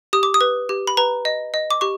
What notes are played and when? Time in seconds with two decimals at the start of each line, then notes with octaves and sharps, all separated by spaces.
0.13 G4 D#6
0.23 D6
0.34 D#6
0.41 B4
0.69 G4
0.87 B5
0.97 B4 A#5
1.25 D#5
1.54 D#5
1.71 D6
1.81 G4 C#6